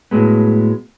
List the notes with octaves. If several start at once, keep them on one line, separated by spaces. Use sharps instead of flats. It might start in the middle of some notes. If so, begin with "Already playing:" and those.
A2 F#3 G#3 B3